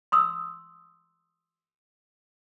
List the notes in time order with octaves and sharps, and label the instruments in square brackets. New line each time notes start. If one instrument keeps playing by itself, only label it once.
[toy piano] C6 D#6 E6